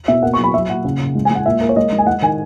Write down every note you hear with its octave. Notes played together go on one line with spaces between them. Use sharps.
B2 E5
A#3 F#5
C#6
F#3 B5
F#3 E5
A#2 F#5
C#3
C#3
G#3
G#5
G#3 F#5
A#2 E5
A#3
C#5
G#3 D#5
G#3
G#5
G#3 F#5
D#3 G#5